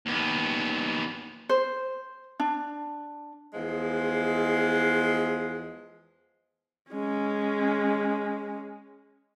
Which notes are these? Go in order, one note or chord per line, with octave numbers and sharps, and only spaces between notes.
D#2 B3
C5
D4
E2 F3 G#3
G#3 C#4